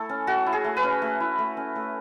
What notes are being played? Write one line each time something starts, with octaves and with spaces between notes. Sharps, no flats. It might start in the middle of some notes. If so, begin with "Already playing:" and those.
Already playing: A3 E4 A4
C#4
A3 F#4
E4
G#4
A3
B4
C#4
A3
E4
A3
C#4
A3